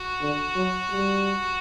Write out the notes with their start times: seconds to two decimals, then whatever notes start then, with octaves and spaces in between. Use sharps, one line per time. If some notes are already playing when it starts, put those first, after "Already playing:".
Already playing: F#4
0.21 D3
0.56 F#3
0.91 G3